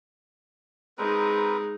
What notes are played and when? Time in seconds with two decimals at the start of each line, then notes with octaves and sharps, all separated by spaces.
0.98 G#3 C4 D#4 A#4 B4